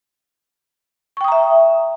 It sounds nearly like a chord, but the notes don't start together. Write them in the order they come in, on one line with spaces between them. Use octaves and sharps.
C#6 G5 D#6 A#5 E5